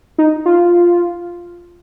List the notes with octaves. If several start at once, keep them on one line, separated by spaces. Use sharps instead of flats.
D#4
F4